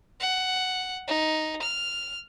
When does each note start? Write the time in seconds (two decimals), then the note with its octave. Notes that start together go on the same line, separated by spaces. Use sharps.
0.20 F#5
1.07 D#4
1.62 F6